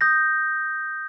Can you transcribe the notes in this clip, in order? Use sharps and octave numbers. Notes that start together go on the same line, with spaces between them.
D#6 G6 A#6